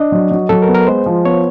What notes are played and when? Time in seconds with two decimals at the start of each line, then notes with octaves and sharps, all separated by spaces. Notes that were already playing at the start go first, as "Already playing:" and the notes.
Already playing: D4 D#5
0.12 F#3
0.31 F#3
0.49 F#3 A4
0.62 A#4
0.68 B3
0.74 A#4
0.87 G#3 C5
1.06 F3
1.25 B3 C#5